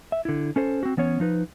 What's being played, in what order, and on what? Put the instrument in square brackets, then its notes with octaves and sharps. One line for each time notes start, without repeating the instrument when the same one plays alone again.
[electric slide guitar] E5
D3 E4
C#4 A4 C5
C4 F#4
E3 B3 C#4 C#5
F3 D#4 B4